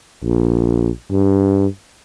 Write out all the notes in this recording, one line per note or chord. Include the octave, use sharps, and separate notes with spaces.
A#1
G2